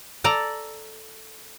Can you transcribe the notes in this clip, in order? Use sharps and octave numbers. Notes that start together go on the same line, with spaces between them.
A4 D5 A#5